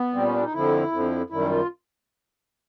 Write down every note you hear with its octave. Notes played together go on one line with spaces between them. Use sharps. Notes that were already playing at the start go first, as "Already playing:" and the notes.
Already playing: B3
A#2 G3 C4
C#4
D4
D#4
F2 D3 F3 E4
F2 D3 F3
F#2 D#3 G3 E4
F4